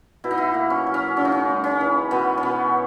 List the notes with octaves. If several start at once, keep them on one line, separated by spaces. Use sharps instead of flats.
B2 E4
D#4
E4
A#3
C#4
F#3
C#4
C#3 C#4
D#4
C#4
G#3
C#4
E3
B2 B3
C#4
B2 B3